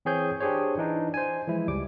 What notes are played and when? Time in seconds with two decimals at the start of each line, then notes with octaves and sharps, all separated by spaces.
0.05 E3 C4 G#4 C#5 G6
0.40 D4 G4 G#4 C5 C#5
0.78 E3 D4 D#4
1.14 C5 G#5
1.48 E3 F3 G#3 E4
1.68 C#2 G3 D6